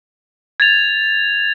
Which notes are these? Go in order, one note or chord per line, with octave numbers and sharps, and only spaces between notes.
G#6 A6 F7